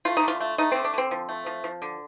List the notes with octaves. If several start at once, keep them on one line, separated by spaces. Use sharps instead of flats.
A3 F4
D#4
D3
F4
A3
A3 D#4
D3 C4
D4
D3 C4
F3
A3
F3
F3
D3